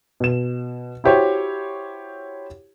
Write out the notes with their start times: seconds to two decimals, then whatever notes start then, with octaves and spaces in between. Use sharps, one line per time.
0.20 B2 E7
1.04 E4 F#4 G4 C5 C#5